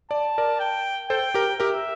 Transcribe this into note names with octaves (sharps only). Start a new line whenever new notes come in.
D5 A5
A#4 D5
G5
A4 C5 G5
G4 A#4
G4 A#4 E5